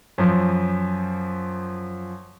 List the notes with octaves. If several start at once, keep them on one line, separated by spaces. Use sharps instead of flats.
F#2 F3